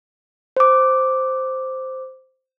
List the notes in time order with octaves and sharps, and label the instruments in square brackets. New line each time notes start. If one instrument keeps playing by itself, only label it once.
[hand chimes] C5 D6